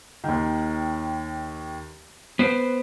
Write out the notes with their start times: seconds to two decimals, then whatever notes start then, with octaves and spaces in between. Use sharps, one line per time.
0.24 D#2 D#3
2.39 B3 B4 C5 D7